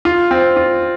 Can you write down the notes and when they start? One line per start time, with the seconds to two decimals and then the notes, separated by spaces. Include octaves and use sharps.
0.05 F4
0.31 C4
0.57 F4